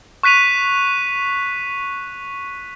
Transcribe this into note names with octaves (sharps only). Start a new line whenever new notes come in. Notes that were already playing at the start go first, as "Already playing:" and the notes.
C#6 F#6 B6 D#7 F7